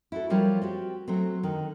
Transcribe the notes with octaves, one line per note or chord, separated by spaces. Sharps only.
E4 F#4 A4
F3 G3 F4 A#4 C#5
C4 F#4 G4
F#3 A3 C4
D3 D#3